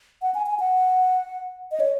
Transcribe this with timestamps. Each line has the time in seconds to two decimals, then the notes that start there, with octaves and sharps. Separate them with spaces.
0.22 F#5
0.34 G#5
0.46 G#5
0.60 F#5
1.71 D#5
1.80 C#5